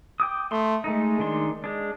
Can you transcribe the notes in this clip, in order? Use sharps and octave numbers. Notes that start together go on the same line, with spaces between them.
G5 D6 D#6
A3 C6
G#3 A3 D#4
D#3 D4 C6
G#3 D4